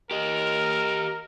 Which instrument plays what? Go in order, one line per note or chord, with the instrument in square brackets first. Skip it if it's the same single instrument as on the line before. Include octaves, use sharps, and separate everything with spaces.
[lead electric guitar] G4 D#5 [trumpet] A#4